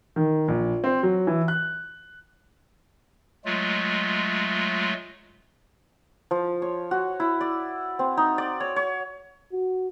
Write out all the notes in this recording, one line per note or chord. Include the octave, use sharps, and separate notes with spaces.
D#3
A#1
C4
F#3
E3
F#6
F#3 G#3 A3 F4
F3
C#5
F#4
E4
D5
C4
D#4
D5
C#5
C#5
F#4